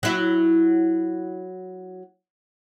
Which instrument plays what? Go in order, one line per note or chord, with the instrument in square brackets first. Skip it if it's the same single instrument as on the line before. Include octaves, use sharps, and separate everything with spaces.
[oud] F#3 E4